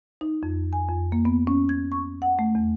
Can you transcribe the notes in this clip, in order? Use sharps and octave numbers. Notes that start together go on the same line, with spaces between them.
D#4
F2
G#5
F2
A#3
B3
C#4
G#6
C#6
F#5
A3
E2